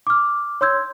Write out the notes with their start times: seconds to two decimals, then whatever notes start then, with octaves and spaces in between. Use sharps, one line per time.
0.07 D6 F6
0.61 C#5 C6 E6 G6 G#6